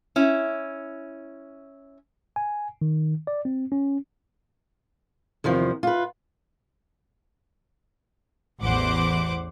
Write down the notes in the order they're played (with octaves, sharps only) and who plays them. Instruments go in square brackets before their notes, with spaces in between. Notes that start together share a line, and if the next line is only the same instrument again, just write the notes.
[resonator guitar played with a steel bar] C#4 E4
[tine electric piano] G#5
D#3
D5
C4
C#4
[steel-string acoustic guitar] E2 C3 D#3 F3
F4 B4
[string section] A1 E2 E3 C5 F#5 D6